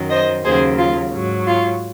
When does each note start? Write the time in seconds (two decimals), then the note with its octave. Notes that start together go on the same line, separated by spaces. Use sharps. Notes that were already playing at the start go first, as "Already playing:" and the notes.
Already playing: F#2 D#3 F#3
0.09 C5 D#5
0.43 D#2 C#3 F#3 G#4 C5
0.78 F4
1.12 G#2 F#3
1.47 F4